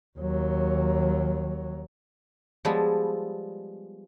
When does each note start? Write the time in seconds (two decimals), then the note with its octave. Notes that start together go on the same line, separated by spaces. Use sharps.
0.19 D#2 F#3
2.65 F3 G3 G#3 B3 A4